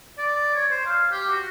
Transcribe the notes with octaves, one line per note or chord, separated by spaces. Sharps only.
D5
C#5
C5
F5
G4
F#4